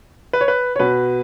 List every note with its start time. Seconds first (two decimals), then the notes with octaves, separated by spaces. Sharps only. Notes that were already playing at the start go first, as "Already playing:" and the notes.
0.33 B4
0.41 C#5
0.48 B4
0.76 C#5
0.79 B2 B4